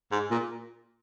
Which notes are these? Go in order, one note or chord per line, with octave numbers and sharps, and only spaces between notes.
G#2
A#2